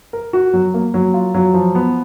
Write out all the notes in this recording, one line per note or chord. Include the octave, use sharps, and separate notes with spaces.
A#4
F#4
F#3
A#3
F#3
F4
F#3
F3
B3